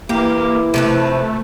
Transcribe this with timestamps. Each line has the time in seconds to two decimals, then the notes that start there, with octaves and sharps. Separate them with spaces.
0.09 E3 A#3 E4 G4
0.74 C3 F3 A3 B4